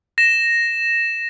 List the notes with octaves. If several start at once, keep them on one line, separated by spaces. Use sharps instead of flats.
A#6 E7